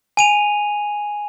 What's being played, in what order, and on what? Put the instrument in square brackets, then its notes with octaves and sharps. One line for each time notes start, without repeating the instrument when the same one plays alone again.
[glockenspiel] G#5 D#7 F7